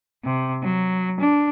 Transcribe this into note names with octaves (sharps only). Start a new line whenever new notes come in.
C3
F#3
D4